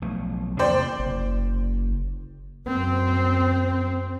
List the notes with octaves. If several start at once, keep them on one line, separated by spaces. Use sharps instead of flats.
B1 F3 A3
E2 C3 A#3 C5 D5 G5
F#1
F#2 C4